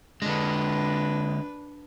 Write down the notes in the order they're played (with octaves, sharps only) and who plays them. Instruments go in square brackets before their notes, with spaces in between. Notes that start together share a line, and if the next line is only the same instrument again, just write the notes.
[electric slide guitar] D3 G#3 [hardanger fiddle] D4 B4